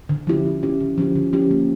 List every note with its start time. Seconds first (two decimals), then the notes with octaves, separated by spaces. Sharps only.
0.09 D3
0.27 F3 C#4 E4 G4
0.46 D3
0.63 F3 C#4 E4 G4
0.81 D3
0.98 F3 C#4 E4 G4
1.16 D3
1.33 F3 C#4 E4 G4
1.51 A#3